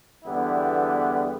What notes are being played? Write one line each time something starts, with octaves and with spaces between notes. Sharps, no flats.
E2 D3 G3 B3 E4